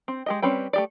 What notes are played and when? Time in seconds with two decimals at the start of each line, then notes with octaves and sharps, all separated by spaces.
0.08 C4
0.26 G#3 G4 D#5
0.42 G3 C4 C#4 B4 G5
0.73 A3 G4 D5